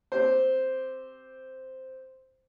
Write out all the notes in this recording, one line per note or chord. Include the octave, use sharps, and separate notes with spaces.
C4 G4 C5